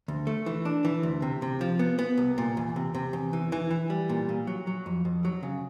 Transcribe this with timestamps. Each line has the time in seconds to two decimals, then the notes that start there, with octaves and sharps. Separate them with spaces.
0.08 D2
0.27 A3
0.46 E3
0.65 D4
0.85 E3
1.03 D2
1.22 C3
1.42 C3
1.61 F3
1.79 B3
1.99 B3
2.18 C2
2.38 A#2
2.57 E2
2.76 C3
2.95 C3
3.13 E2
3.33 E3
3.52 E3
3.70 E3
3.90 G3
4.09 A#2
4.29 A#2
4.47 F#3
4.67 F#3
4.86 F2
5.05 F2
5.25 F#3
5.43 C#3